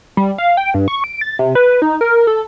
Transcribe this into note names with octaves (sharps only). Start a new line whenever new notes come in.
G3
F5
G5
G2
C#6
D7
A6
C3
B4
D#4
A#4
A4